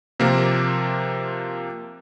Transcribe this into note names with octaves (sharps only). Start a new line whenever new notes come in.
C3 F3 A#3 A#4 D6